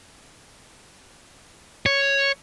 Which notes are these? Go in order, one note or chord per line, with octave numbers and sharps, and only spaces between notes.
C#5